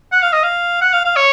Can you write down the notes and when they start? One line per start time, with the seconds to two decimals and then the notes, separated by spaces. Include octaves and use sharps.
0.12 F#5
0.23 F5
0.33 D#5
0.43 F5
0.81 F#5
0.93 F5
1.05 F5
1.16 C#5